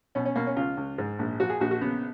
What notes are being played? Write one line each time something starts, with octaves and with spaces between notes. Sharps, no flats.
B2 C#4
C#4
B2 A#3
C#4
C#2 F4
C#2
G#2
A#1
F3 F#4
G#4
A#1 F#4
F#4
C#3 B3